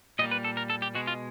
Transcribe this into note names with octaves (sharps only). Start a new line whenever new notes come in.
A#2 G3 A#3 D#5
B4
A4
A#4
A4
G4
B2 G#3 F#4
F4